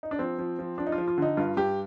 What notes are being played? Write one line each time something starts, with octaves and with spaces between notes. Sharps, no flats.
D#4
D4
F3 C4
F3
F3
F3 D4
D#4
F4
F3
F4
D3 D#4
G2 F4
G2 G4